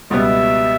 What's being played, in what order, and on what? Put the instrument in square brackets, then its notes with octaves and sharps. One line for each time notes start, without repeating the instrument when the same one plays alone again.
[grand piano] C#2 B2 G3 B3 [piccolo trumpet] E5